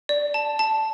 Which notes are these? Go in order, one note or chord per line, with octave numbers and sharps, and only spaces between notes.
D5
A5
A5